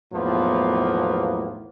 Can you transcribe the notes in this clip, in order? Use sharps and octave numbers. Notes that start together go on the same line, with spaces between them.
B1 E2 A2 F3 A#3 B3